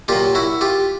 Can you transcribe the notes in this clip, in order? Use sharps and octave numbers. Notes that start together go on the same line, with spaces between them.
A#2 F#3 F4 G4
E4 F#4
F4 G4